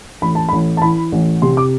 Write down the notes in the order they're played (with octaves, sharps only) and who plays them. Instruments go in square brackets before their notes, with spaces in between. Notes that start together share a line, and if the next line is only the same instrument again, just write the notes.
[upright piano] A1 B5
A5
A1 B5
A5
E3 B5
A1
C3 C6
D6